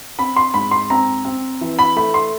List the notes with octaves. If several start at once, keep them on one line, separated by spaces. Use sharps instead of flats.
C4 B5
C6
G#2 B5
C6
C4 A#5
C4
E3
B5
A3 B5
C6